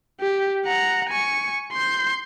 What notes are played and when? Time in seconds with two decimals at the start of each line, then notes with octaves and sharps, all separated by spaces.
0.21 G4
0.65 F#5 A#5
1.09 G#5 C#6
1.73 C6 G6